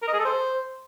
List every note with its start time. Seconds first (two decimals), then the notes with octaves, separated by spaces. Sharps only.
0.02 A#4
0.08 D#5
0.14 G#4
0.19 A4
0.25 C5